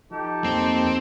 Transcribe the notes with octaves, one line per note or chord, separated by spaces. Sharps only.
F3 D#4 G4 A4
F2 A#3 C4